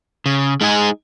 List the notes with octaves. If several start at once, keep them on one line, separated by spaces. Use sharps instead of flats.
C#3
G#3 D#4 G#4